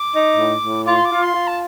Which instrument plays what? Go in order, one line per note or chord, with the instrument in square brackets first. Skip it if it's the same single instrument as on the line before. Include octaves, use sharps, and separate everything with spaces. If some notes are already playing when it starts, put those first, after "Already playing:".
Already playing: [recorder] D6
[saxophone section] D#4
A2
A2
[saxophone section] F4 [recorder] D6
[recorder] C6
D6
[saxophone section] F4
[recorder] C6
[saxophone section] F4
[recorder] A5